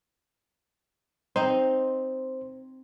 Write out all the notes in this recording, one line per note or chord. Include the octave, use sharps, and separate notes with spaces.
C4 D#4 C5